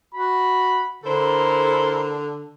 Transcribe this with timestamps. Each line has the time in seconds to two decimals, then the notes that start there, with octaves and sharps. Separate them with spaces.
0.15 F#4 B5
1.04 D3 E4 A4 A#4 C5